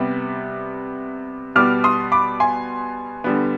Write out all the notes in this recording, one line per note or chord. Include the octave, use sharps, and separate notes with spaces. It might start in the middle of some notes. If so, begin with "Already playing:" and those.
Already playing: C3 G3 B3
B2 G3 B3 D6 F6
C6 D#6
B5 D6
G#5 C6
D3 G3 B3